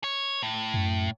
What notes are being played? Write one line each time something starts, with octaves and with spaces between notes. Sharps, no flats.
C#5
A2
F#2